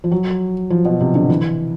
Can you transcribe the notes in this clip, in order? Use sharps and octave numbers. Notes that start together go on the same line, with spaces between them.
F3
F#3
F3
B2
C3
D3
E3